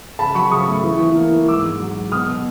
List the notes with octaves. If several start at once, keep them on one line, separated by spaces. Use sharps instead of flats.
C#3 A5 B5
F#3 B5 C#6
C#3 C#6 D#6
A3
E3
E3
A#3
E3
G#2 D6 E6
G#2
F#3
F#3
B2 D#6 F6
B2